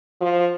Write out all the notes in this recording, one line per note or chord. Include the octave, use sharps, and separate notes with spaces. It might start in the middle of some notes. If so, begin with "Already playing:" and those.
F3